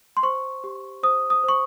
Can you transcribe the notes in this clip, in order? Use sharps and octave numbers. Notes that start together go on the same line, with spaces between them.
C6
C5 C#6
G4
C5 D#6
D#6
C5 C#6